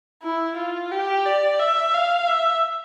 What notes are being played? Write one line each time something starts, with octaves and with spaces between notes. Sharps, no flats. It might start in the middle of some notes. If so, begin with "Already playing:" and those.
E4
F4
G4
D5
E5
F5
E5